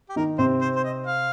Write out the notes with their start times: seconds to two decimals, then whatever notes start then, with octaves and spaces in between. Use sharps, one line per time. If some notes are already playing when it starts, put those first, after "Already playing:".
0.09 G4
0.16 D#3 D#4 A#4
0.38 C3 C4 C5
0.61 C5
0.76 C5
0.84 D#5
1.07 F5